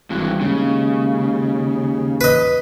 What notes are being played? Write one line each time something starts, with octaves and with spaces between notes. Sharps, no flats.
G#1 G2 E3
D#2 C#3 G#3
B4 D#5